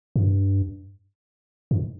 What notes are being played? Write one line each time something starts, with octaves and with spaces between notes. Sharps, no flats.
G2
G2